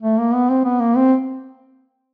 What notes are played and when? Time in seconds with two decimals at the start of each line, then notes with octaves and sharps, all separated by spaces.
0.03 A3
0.18 A#3
0.34 B3
0.50 C4
0.65 B3
0.80 A#3
0.97 C4